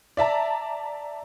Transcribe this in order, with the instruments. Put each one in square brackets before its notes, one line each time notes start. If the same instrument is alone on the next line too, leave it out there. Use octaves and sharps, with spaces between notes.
[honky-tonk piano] D5 E5 A5 A#5